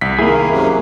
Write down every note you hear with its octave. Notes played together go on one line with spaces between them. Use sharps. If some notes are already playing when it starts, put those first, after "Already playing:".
C2 B6
D#3 A#3 E4 G#4
F#2 C3